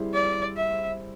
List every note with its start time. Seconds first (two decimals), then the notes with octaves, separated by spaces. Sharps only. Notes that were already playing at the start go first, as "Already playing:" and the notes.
Already playing: G3 C4 E4 G#4 C5
0.14 D5
0.57 E5